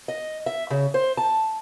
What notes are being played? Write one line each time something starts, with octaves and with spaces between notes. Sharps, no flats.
D#5
E5
C#3
C5
A5